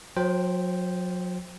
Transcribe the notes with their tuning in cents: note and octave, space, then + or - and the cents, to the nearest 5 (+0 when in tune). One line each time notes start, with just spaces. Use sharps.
F#3 -35 C5 +0 G5 +0